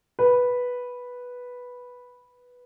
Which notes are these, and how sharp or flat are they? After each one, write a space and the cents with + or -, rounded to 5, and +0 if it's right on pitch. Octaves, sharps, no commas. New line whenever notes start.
B4 -5